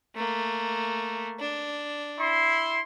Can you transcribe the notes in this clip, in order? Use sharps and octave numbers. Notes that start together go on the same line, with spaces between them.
A3 A#3
D4
E4 C6